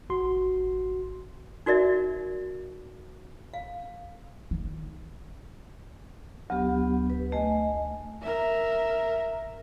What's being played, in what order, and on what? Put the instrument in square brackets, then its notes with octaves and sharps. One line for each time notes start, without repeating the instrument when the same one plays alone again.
[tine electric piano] G#1 F#4 C6
[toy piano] D#4 F#4 A#4 D5 E5
F5
[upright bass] D#3
[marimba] D2 [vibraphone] F#3 B3 G4
[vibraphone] B4
[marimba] A3 [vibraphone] D#5 G#5
[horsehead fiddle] A#4 E5